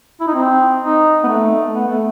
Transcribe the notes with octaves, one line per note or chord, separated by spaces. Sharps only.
E4
D#4
C4
D#4
B3
A3
B3
A3